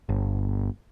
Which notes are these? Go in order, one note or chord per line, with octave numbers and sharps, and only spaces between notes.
G1